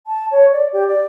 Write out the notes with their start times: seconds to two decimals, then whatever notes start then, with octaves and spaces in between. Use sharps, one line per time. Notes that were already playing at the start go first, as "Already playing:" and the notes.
0.07 A5
0.31 C#5
0.53 D5
0.73 G4
0.88 D5